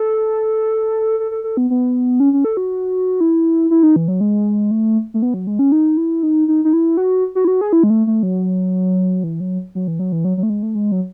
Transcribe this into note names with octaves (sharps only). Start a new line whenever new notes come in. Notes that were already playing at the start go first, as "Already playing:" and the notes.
Already playing: A4
A4
A4
A4
B3
B3
C#4
C#4
A4
F#4
E4
E4
D#4
E3
F#3
G#3
A3
A3
B3
F#3
G#3
C#4
D#4
E4
D#4
D#4
D#4
E4
F#4
F#4
E4
F#4
G#4
E4
G#3
A3
A3
F#3
E3
F#3
F#3
E3
F#3
E3
F#3
F#3
A3
G#3
A3
G#3
F#3